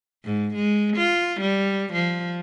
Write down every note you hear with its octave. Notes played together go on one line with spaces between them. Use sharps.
G#2
G#3
F4
G3
F3